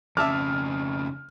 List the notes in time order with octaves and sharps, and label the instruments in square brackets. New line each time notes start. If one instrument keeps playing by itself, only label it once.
[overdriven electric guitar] F2 C#3 [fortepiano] E5 A5 D6 [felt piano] F6